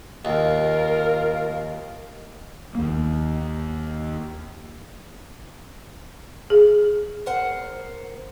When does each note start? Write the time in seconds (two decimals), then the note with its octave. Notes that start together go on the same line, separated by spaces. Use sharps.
0.25 D#2 F4 A#4
2.75 D#2 A#3
6.50 G#4
7.26 A#4 C5 F#5